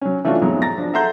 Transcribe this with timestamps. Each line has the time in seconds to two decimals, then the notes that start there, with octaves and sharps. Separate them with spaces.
0.01 F#3 C#4
0.24 E3 A3 C#4 D4 F4 F#4
0.41 F2 G#2 B2 F#3 G#3
0.62 A#5 A6 A#6
0.78 F3 D4
0.93 A4 E5 F#5 A#5 C6 G6